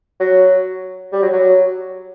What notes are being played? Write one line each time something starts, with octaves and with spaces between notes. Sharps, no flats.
F#3
G3
F#3
F#3